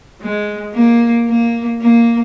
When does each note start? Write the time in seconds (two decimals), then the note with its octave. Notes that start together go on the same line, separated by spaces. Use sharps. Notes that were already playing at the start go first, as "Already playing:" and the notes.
0.21 G#3
0.74 A#3
1.28 A#3
1.81 A#3